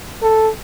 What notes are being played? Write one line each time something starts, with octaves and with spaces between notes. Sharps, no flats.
A4